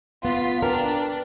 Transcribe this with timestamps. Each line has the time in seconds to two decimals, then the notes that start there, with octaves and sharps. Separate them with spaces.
0.25 B3 F4 B6
0.62 D4 A#4 B4 G5